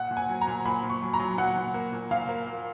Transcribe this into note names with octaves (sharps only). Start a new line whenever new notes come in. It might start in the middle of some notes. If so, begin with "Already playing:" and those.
Already playing: A#2 F#5
A#2
G#5
F#3
A#5
A#2
A#2 B5
A#2
C#6
F#3
A#5
F#3
A#2 F#5
A#2
A#3
A#2
A#2 F5
A#3
A#3